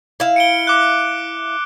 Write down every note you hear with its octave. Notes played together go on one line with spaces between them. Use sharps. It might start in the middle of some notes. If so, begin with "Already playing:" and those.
E4 F5
C#7 D7 G7
D6 F#6